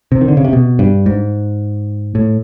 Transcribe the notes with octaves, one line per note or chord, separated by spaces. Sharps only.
C3
D#3
D3
C#3
C3
B2
G2
G#2
A2